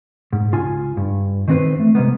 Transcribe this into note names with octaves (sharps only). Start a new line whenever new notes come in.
G#2
C#2 F4 G#5
G2
D#3 E3 C4 C#4 B4 C5
A3
C3 G#3 A#3 B3